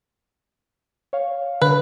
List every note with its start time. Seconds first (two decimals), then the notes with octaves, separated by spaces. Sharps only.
1.13 C#5 F5
1.62 D3 B4